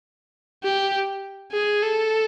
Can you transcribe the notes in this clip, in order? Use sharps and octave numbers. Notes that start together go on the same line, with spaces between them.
G4
G#4
A4